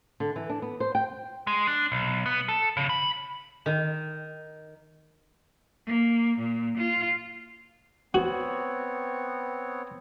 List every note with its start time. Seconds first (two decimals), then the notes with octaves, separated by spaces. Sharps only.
0.20 D3
0.36 E3
0.49 D4
0.62 B3
0.80 C5
0.95 G5
1.47 G#3
1.67 D4
1.92 B1
2.26 B3
2.49 A4
2.77 C#3
2.89 B5
3.66 D#3
5.87 A#3
6.39 A#2
6.78 F4
8.14 B3 C4 F#4 C#5